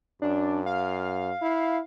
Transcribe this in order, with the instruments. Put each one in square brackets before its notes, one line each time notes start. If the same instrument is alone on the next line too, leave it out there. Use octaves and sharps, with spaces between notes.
[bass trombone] F#2 [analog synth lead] D4
[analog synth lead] F5
[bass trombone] E4